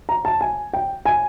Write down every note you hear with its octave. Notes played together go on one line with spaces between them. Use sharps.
A#5
A5
G#5
G5
G#5